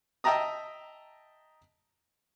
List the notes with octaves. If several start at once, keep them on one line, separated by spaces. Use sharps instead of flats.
D#5 E5 G5 A5 A#5 D#6